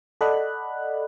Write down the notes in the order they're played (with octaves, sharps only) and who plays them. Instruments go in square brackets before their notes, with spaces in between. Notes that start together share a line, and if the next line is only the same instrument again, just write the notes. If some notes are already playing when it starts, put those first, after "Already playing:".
[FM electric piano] A4 D5 D#5 F#5 B5 F#6